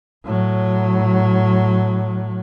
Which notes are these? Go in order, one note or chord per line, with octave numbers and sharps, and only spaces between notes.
A2 F#3